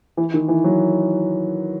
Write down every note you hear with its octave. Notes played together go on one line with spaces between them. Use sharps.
E3
D#3
E3
F#3